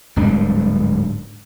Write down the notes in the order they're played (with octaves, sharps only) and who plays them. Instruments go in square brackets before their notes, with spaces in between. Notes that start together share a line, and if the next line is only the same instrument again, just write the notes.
[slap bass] D1 G#2 G3 D4